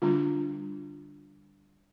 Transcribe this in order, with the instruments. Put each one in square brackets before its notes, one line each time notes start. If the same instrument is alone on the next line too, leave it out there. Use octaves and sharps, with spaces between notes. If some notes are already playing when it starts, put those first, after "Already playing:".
[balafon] D3 G3 D4 F4